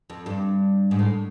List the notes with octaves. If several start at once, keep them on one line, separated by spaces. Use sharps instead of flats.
F2
G2
G#2
A2